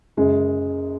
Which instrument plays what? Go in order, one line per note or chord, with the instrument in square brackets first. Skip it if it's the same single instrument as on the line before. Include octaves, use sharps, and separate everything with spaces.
[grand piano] F#1 F#2 C#3 G#3